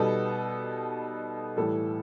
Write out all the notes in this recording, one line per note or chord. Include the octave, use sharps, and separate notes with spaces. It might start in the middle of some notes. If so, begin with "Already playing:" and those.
Already playing: B2 G3 B3 D#4 A4
A2 E3 G3 A4